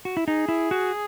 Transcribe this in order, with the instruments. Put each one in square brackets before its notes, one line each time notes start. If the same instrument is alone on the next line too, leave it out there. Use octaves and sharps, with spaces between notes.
[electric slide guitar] F#4
E4
[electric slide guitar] D#4 [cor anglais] G#4
[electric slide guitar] E4
F#4